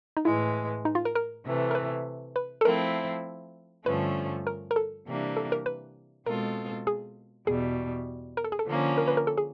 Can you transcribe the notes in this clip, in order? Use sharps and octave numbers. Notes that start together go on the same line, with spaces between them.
D#4
A2 E3 G#3 E4
D#4
F4
A#4
A#4
C3 E3 A3
A#4
B4
B4
A4
F3 A3 C4 E4 A#4
G2 D3 F3 A3 C#4 B4
A#4
A#4
A4
C3 E3 G3 A#3 D4
A4
A#4
B4
B2 G#3 C4 F4 A4 A#4
G#4
E2 B2 G3 G#4
A#4
A4
G#4
A4
D3 F3 A#3 C#4
A#4
B4
A#4
A4
G#4